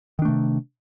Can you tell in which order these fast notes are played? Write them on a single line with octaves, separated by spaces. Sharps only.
D#3 D4 A3 C3